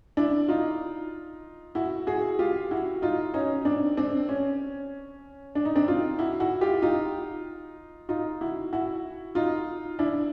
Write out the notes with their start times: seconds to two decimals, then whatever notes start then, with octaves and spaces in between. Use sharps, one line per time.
0.17 D4 E4
0.48 D#4 F4
1.75 E4 F#4
2.07 F#4 G#4
2.39 F4 G4
2.71 E4 F#4
3.02 D#4 F4
3.34 C#4 D#4
3.65 C4 D4
3.97 C4 D4
4.29 C#4
5.55 D4
5.65 D#4
5.75 C4 D4
5.88 D#4 F4
6.19 E4 F#4
6.40 E4 F#4
6.61 F4 G4
6.82 D#4 F4
8.09 D#4 F4
8.41 E4 F#4
8.73 E4 F#4
9.35 D#4 F4
9.99 D4 E4